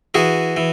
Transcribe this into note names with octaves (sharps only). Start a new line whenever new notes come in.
E3 F#4 G#4
E3